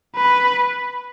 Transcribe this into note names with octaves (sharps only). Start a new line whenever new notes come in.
B4